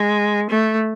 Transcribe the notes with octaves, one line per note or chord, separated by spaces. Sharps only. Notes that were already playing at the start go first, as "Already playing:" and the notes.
Already playing: G#3
A3